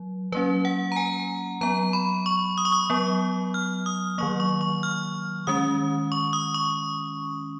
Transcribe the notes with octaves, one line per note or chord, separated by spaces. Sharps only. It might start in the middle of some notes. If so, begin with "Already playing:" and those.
Already playing: F#3
F#3 A#3 C#4 B4
F#5
A#5
G#5
F#3 B3 A#5
B5
C#6
D#6
C#6
D#6
F#3 B3
F6
D#6
D#3 F#3 A#3 C#6
C#6
C#6
F6
D#3 G#3 C#4 D#6
C#6
D#6
C#6